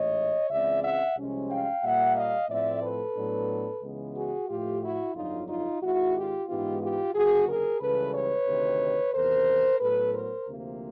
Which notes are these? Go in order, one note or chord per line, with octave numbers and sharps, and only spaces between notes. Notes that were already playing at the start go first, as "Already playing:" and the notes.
Already playing: A1 G#2 E3 A3 C#5 D#5
C#2 C#3 E3 G#3 C4 D5 E5
E5 F#5
C2 C3 F3 G#3 C#4
F5 G5
A#2 G3 A#3 E5 F#5
D#5 F5
A2 F3 A3 C4 D5 E5
A4 B4
A2 F#3 B3 D4
C#2 C#3 E3 G#3 B3
F#4 G#4
A2 F3 A3 F4 G4
E4 F#4
G1 F2 D3 F#3 D#4 F4
D#4 F4
G#1 G#2 D#3 E4 F#4
F4 G4
G#2 E3 G#3 B3 D#4 F4 G4
F4 G4
F#1 F#2 D3 F#4 G#4
G#4 A#4
C#2 C#3 E3 G3 A4 B4
B4 C#5
D2 C3 D#3
E2 C3 D#3 A#4 C5
A2 F#3 B3 A4 B4
A#4 C5
D2 C3 F3 A#3